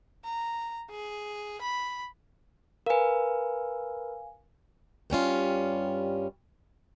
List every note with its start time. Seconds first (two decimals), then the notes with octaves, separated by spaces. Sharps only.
0.25 A#5
0.90 G#4
1.62 B5
2.86 A#4 B4 F5 G#5
5.10 G2 G3 C#4 F4